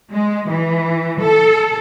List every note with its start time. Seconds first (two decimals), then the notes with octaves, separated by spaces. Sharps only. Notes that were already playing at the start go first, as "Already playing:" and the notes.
0.12 G#3
0.49 E3
1.21 A4